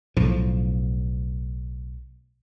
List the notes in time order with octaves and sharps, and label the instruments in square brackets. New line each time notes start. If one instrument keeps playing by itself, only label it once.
[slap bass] B1 A2 F3